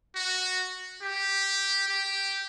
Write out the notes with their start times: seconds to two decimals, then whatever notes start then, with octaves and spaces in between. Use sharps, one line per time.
0.15 F#4
1.02 G4
1.89 G4